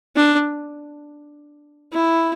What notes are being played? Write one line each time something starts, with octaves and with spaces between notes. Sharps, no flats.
D4
E4